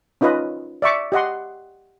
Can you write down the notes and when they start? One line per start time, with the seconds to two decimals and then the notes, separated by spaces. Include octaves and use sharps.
0.21 C#4 D#4 F4 B4 D#5
0.82 D5 E5 C#6 D6
1.12 G4 D#5 F#5 C6